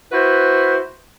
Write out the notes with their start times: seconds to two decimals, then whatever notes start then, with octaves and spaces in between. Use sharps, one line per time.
0.12 E4 F#4 B4 C5